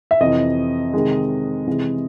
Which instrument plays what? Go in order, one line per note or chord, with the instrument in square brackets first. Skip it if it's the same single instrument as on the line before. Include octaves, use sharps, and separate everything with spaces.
[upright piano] E5
F2 C3 E3 D#5
C3 D#3 G#3
C3 E3 G#3